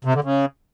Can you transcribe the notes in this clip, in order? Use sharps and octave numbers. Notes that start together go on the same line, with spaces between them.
C3
D3
C#3